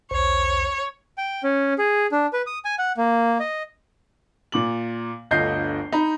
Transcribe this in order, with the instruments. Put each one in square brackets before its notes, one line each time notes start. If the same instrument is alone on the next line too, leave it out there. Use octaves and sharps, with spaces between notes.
[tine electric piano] B1 E2 C5 [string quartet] C#5
[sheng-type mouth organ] G5
C#4
G#4
D4
B4
D#6
G#5
F#5
A#3
D#5
[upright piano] A#2 D6 F#7
G1 D2 F4 D#5 G6 C7
D#4 B5